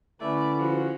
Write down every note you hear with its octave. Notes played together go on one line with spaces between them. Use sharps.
D3 A3 C#4 E4 B4 D5
F3 F#4